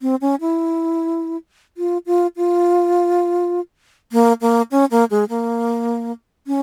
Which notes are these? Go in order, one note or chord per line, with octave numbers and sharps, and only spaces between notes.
C4
C#4
E4
F4
F4
F4
A#3
A#3
C#4
A#3
G#3
A#3
C#4